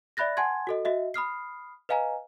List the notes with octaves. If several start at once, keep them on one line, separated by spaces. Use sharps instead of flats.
D5 E5 B5 F#6 A6 A#6
F#5 G#5 A5 C6 G#6
F#4 A4 D#5
F#4 D#5 E5
B5 D#6 F6 C7
B4 D#5 F5 G#5 A#5